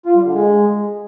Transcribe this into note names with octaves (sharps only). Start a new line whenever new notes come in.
F4
G3
D3
G#3